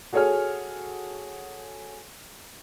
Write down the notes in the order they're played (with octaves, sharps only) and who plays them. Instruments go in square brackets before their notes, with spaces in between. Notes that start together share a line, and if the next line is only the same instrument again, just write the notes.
[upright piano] F#4 G#4 A4 C#5 G#5 F6